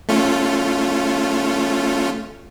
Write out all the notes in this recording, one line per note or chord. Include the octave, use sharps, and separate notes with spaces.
A3 C#4 F4